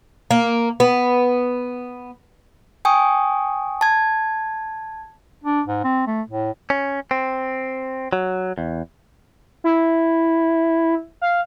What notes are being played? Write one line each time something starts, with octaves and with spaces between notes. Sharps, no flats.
A#3
B3
G5 G#5 C#6 D#6
A5 G#6
D4
G#2
C4
A3
A2
C#4
C4
F#3
E2
E4
F5